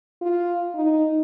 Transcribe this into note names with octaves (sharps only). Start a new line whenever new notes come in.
F4
D#4